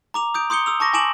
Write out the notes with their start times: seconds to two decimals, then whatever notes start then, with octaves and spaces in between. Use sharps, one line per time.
0.14 A#5 D6 F7
0.34 D#6 G6 D7
0.50 C6 D#6 G6 C#7 G7
0.66 D#6 E6 F7
0.80 A5 C#6 D6 A#6
0.93 G#5 A5 D6 D7 E7 F#7